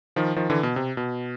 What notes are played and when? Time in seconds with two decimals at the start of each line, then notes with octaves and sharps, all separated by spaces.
0.16 D#3 F3
0.36 D#3 F3
0.50 D3 E3
0.63 B2
0.76 C3
0.97 B2